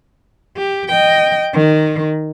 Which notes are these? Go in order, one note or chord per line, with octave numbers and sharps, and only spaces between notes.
G4
D#5 G5
D#3